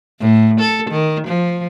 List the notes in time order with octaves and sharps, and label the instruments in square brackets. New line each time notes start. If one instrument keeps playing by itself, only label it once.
[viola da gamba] A2
A4
D#3
F3